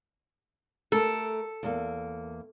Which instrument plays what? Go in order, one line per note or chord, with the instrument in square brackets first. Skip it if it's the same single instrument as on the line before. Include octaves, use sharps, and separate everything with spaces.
[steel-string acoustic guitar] A3 A#4 [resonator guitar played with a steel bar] A4
[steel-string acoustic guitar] E2 A#3